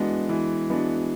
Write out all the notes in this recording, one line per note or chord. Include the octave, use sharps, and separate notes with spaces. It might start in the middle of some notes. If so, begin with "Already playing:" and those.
Already playing: E3 G#3 B3 D4 F#4
E3
G#3 B3 D4 F#4